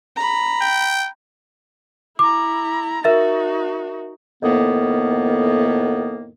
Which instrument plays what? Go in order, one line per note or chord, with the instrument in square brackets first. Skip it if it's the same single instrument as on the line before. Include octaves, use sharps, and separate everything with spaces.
[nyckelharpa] A#5 B5
[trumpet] G5
[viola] E4 A#5 [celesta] D6
[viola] D#4 F#4 [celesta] A#4 E5 A6
[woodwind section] F2 A2 D#3 A#3 B3